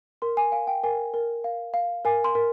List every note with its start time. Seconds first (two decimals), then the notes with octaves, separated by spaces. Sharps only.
0.22 A#4 C6
0.37 G#5
0.52 F5 G#5
0.67 G5
0.84 A#4 G#5
1.14 A#4
1.44 F5
1.74 F5
2.05 A#4 G#5
2.24 C6
2.35 A#4